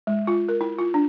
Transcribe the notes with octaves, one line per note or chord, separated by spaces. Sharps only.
G#3
F4
A#4
E4
F4
D4